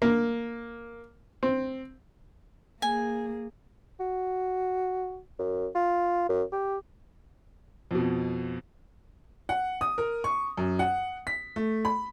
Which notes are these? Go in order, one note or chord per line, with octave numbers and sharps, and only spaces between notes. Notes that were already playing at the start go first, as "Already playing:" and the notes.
A#3
C4
A#3 G#4 G#5
F#4
F#2
F4
F#2
G4
F2 B2
F#5
D#6
A#4
C#6
F#2
F#5
B6
A3
B5